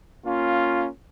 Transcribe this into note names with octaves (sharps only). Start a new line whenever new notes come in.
A#3 C#4 F4